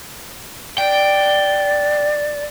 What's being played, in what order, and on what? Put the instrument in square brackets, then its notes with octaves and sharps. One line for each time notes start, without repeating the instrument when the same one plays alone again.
[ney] D5 [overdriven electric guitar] G5